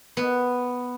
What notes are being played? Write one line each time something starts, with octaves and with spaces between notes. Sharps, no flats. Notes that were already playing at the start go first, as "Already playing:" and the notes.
B3